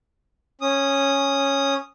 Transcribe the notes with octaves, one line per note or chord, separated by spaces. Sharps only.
C#4 D#6